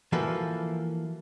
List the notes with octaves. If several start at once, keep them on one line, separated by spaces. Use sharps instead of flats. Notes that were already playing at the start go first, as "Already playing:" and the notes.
E3 F3 A#3 F#4 A4 B4